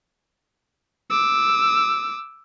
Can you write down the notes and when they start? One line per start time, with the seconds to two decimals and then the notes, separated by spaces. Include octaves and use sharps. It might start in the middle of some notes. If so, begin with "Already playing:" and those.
1.10 D6 E6